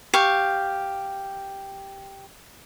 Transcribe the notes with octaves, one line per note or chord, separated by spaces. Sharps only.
G4 F5 C#6